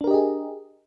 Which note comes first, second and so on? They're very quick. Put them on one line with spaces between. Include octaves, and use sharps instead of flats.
D4 A#4 G4 D#5 G#4